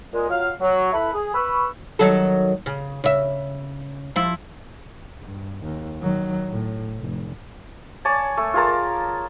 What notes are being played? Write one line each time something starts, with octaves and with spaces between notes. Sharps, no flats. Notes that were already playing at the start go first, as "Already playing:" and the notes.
A#2 G#3
F#3 F4 F5
F#3
E4 A4 B4 B5
G#4
B4 B5 C#6 E6
D#3 F#3 A4
C#3
C#3 E5
F3 E4
G2
D#2
D#3 F#3
A2
F1
C#5 D5 G#5 A5
A3
F4 G#4 A#4 A5